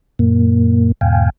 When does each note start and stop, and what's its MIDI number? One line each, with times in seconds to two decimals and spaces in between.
0.19 0.92 42
0.19 0.92 46
0.19 0.92 58
1.01 1.30 40
1.01 1.30 44
1.01 1.30 47
1.01 1.30 77
1.01 1.30 79
1.01 1.30 80